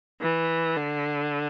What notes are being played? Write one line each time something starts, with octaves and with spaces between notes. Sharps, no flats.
E3
D3